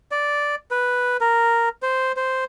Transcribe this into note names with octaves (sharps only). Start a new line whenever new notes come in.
D5
B4
A#4
C5
C5